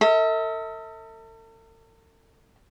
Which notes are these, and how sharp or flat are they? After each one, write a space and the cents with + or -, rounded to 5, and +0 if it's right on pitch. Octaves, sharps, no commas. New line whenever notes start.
A4 +45 E5 -40